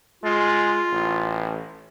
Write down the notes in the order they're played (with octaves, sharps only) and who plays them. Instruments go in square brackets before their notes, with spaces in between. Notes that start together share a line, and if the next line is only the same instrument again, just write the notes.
[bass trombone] G#3 [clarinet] F4
[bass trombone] A1